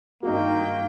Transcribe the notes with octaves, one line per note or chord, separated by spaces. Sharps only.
G2 D#3 A#3 D#4 F#4 G5